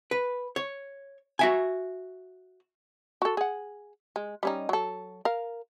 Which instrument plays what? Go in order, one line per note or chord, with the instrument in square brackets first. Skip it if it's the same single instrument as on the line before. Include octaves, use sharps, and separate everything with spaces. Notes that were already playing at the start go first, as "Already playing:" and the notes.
[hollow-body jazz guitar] B4
C#5
F#4 E5 G#5
[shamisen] F#4 A4
G#4 F#5
G#3
G3 C#4 D#4
F#3 A4
A#4 F5